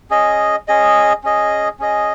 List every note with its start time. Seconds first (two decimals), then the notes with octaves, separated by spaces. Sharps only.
0.10 C#4 G#4 D#5
0.68 C#4 G#4 D#5
1.24 C#4 G#4 D#5
1.79 C#4 G#4 D#5